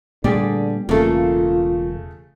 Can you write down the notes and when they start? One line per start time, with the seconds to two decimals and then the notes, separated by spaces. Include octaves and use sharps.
0.24 A#2 D3 G3 A3 B3 G4 G#4 D5
0.89 E1 C#3 A3 A#3 F4 A4